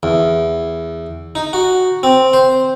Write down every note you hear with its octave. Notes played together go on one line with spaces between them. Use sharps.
E2
D#4
F#4
C4
C5